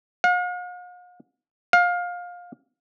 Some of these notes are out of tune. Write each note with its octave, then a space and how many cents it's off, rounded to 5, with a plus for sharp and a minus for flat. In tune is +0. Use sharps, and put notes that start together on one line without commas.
F5 +45
F5 +20